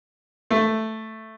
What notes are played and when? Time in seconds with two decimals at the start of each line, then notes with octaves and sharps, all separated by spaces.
0.50 A3